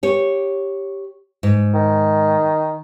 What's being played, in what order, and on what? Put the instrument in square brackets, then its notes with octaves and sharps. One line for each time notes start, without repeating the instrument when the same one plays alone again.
[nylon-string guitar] G4 C#5
G#2
[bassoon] D#3